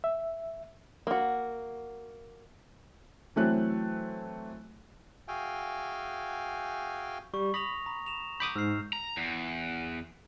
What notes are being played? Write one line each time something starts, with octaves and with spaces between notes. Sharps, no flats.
E5
A#3 F#4
E3 F#3 A3 C4 F#6
F#4 G#4 E5 F5 G5 G#5
G3 C#6
B5 D#6 A#6 F7
A#5
E7 F7
B5 D6 D#6 G6
G#2 E6 F6 C7
A#5
E2